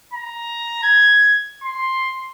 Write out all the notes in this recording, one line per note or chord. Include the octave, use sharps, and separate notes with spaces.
A#5
G#6
C6